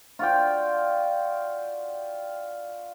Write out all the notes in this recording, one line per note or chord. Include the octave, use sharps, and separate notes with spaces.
F4 F#4 D5 G5